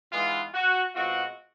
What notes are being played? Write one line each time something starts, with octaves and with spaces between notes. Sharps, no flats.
G#2 E3 G#3 B3 F4
F#4
B2 G#3 C4 F4 F#4